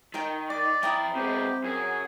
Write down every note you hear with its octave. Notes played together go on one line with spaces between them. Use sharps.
D#3 A#4 G5
D5 D6
F3 E4 G5 A#5 D#6
B2 G#3 C4 G4
F#2 G#4